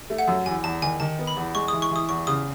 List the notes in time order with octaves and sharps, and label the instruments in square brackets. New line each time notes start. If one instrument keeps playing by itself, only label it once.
[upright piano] A3
[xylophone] F#5
[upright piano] F#2
[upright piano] E2 [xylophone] G#5
[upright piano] E2 [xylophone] A5
[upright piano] D#3 [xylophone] G#5
[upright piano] D#3 [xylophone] A5
[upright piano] B3
[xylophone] B5
[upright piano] E2
[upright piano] G#3 [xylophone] C#6
[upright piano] E3 [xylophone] D#6
[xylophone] C#6
[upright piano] E3 [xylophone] D#6
[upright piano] E2 [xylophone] C#6
[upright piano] C#3 [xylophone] D#6